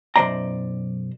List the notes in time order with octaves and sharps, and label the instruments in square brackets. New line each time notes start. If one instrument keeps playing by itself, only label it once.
[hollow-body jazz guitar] B1 F#2 G3 C5 D5 A#5